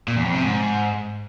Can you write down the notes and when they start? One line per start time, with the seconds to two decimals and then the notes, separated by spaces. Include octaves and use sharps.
0.08 A#2
0.16 E2
0.25 F2
0.34 C3
0.43 G#2